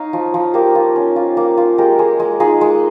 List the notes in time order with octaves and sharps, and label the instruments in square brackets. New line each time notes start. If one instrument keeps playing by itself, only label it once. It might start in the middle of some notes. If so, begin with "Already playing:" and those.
Already playing: [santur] D#4 C#5 F5
F3
F3
A#3 G4 A#4
F4
C#4
F4
A#3
F4
G#3 G4 A#4
G#3
G#3
D#4 F4 G#4
G#3